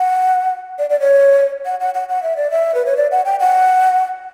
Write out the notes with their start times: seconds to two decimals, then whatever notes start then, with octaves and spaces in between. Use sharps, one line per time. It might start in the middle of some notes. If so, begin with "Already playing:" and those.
Already playing: F#5
0.78 D5
0.90 D5
1.00 C#5
1.66 F#5
1.80 F#5
1.94 F#5
2.09 F#5
2.23 E5
2.37 D5
2.50 E5
2.75 B4
2.86 C#5
2.97 D5
3.11 F#5
3.25 G5
3.40 F#5